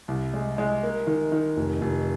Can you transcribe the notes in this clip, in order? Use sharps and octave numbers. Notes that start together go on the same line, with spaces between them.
C2
G#3
G#3
A#3
D#3
D#3
F1
F1